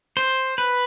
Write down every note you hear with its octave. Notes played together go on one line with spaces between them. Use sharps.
C5
B4